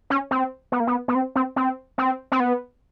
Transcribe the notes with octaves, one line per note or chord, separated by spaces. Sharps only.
C#4
C4
B3
A#3
B3
B3
C4
C4
C4
C4
C4
B3